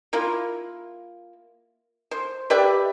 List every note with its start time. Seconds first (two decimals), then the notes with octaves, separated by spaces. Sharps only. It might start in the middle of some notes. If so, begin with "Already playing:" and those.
0.13 A#3 E4 F4
2.11 C5
2.50 G4 B4 D5 E5